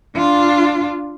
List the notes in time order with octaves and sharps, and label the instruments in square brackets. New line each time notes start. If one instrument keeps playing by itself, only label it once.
[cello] D4 F4